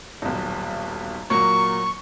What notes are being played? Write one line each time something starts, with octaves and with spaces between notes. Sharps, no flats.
D#1 B1
A#2 F#3 A#3 C#6